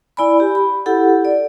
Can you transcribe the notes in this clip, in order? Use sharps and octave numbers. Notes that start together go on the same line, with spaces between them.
E4 D5 G#5 B5
G4
B5
E4 G4 A4 F#5
D5